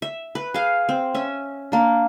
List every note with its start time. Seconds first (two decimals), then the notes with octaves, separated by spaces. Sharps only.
0.02 E5
0.35 B4
0.54 G#4 F5
0.89 C4
1.14 C#4 E5
1.72 A#3 D4